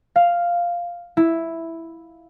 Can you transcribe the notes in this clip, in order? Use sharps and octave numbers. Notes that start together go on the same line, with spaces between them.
F5
E4